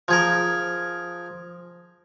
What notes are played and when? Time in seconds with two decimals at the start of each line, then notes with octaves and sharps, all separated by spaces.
0.08 F3 G#4 A#4